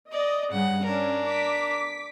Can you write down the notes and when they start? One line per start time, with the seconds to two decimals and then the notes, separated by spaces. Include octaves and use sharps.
0.12 D5 D#5
0.52 G2 C#3 F#5
0.85 C#4 D4 A#4
1.28 D6 B6